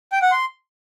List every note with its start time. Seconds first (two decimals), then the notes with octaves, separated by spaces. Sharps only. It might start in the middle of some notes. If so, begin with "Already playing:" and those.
0.12 G5
0.22 F#5
0.32 C6